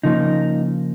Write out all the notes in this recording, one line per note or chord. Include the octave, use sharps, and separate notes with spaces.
C#3 F3 A#3 D#4